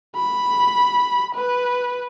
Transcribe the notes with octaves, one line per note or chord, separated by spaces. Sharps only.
B5
B4